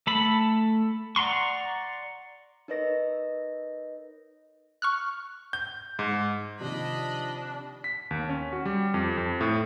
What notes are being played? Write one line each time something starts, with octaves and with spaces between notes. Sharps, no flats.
A3 A4 B5
D5 F#5 A#5 C6 C#6
D#4 A#4 B4 C#5 D#5 A#6
C#6 F6 F#6
G6
G#2
C3 D#3 F3 A#3 D4 D#5 B5
B6
D#2
C#4
F#4
G3
F2
F2
A2